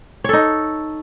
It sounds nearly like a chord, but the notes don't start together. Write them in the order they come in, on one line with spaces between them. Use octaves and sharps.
C#5 A4 D#4